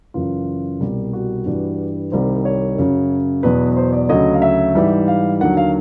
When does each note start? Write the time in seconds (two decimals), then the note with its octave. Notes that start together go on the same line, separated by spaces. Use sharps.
0.14 F#2 C#3 E3 F4
0.80 C2 B2 G3
1.13 F#4
1.46 G2 E3 G3
2.12 C2 C3 D#3 G3 C5
2.45 C#5
2.78 F#2 C#3 F#3
3.43 E2 B2 F#3 B4
3.77 C5
3.93 D5
4.09 D2 C#3 F#3 D#5
4.34 F5
4.42 E5
4.75 G#2 E3 G3
5.08 F5
5.40 D#2 D3 F#3 F#5
5.57 F5